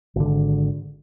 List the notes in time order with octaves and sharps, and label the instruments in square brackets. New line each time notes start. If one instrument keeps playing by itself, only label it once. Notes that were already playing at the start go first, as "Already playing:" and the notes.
[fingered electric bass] G#1 D3